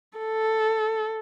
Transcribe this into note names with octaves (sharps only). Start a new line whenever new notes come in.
A4